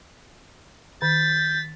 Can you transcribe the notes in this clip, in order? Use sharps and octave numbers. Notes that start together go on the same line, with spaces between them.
D#3 G6 A6 B6